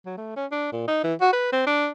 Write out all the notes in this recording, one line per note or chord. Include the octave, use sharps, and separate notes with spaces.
F#3
A3
C#4
D4
A#2
D#4
E3
F#4
B4
C4
D4